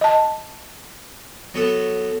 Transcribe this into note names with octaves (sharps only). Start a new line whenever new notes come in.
D#5 A5
F#3 B3 A4